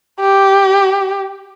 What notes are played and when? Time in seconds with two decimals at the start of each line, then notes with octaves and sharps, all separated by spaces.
0.20 G4